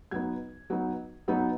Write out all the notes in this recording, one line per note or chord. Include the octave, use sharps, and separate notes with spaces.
F#3 B3 D#4 G#6
F#3 B3 D#4
F#3 B3 D#4